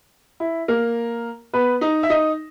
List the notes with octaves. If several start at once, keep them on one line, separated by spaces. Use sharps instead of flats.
E4
A#3 A#4
B3 B4
D#4 D#5
E5
D#4 D#5